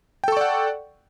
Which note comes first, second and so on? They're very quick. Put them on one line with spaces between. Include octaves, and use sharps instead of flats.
G5 A4 C#6 D5 F#5